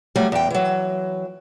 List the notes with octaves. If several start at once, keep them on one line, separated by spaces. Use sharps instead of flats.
F#3 G3 A3
E2 G5
E3 F#3